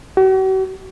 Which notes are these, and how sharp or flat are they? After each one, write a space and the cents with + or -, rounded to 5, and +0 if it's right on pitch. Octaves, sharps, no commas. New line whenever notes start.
F#4 +45